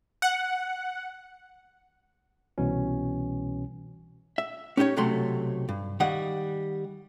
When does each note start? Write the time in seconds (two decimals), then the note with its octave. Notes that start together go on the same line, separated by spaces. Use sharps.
0.22 F#5
2.58 C2 B2 E3 C#4
4.38 E5
4.77 C#4 D#4 G4 B4 C#5
4.96 B1 C3 F#3 A3 C6
5.69 G2
6.00 D#3 G3 D#5 F5 F#5